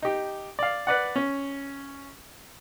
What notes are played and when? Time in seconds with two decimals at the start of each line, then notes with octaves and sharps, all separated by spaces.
0.02 D#4 G4
0.59 D5 F5
0.87 B4 D5 F#5
1.16 C#4